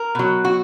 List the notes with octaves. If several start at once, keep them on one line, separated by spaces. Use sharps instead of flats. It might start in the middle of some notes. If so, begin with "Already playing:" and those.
Already playing: A#4
B2 F#3
F#4